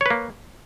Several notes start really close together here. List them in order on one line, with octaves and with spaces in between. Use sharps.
C#5 B4 A#3